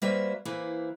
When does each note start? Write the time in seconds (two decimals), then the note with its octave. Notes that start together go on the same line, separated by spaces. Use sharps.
0.02 G3 A#3 F#4 B4 C5 E5
0.45 E3 A#3 E4 B4 C5